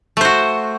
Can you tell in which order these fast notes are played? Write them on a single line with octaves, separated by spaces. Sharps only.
A3 C5 F#4